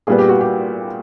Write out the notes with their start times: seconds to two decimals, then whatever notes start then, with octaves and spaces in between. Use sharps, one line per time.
0.07 A#2 G3 B3 G#4
0.18 G4
0.29 F#4
0.41 G4